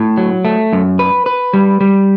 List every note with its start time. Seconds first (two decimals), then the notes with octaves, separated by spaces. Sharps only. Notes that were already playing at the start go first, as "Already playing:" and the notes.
Already playing: A2
0.17 F#3
0.45 A3
0.73 F#2
0.99 B4
1.26 B4
1.53 G3
1.81 G3